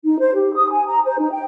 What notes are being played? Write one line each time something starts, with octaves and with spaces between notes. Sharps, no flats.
D#4
C5
G4
D#6
G#5
A#5
C5
D#4
G5